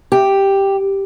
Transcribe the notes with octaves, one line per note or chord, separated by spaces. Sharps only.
G4